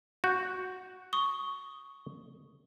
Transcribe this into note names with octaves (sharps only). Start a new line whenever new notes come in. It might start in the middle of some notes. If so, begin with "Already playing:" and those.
F#4 G6
C#6 D#6 G7